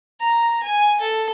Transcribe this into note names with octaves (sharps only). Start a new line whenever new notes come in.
A#5
G#5
A4